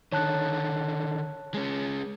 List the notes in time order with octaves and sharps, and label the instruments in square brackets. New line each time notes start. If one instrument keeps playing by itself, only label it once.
[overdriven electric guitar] D3 D#3 [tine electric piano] C#5 A5 F#6
[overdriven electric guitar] G#3 C#4